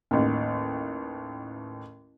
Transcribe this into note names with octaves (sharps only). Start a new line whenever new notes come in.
A1 D#2